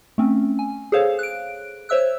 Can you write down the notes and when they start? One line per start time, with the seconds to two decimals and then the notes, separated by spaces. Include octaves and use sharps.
0.18 A3 C4 C#4
0.59 G#5
0.92 G#4 A4 C5 C#5 F5
1.19 F#6 D7
1.89 C5 C#5 E5 E6 F#6